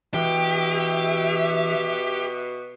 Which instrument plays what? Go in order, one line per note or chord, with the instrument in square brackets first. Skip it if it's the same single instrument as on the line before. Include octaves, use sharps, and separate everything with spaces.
[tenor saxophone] B2 [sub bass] E3 [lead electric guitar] G4 [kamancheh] E5